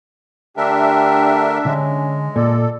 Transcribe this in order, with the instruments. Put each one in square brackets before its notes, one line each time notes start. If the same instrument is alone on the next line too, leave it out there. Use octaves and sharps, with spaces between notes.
[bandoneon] D3 A3 A#4 [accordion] D4 E5 [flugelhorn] G4
[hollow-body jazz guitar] D3 [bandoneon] G#3 [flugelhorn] C#4
[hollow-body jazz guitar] A#2 [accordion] A4 [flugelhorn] D5